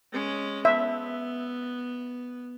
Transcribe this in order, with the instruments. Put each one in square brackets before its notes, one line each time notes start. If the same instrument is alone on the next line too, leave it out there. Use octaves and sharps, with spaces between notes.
[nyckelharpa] G#3 C#4
[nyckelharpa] B3 [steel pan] E5